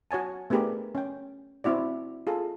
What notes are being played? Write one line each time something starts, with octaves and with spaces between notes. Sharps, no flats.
F#4 C#5 G#5 A5
A3 B3 D4 G4 G#4 A#4
C#4 G5
C4 E4 F#4 D5
F4 G#4 A4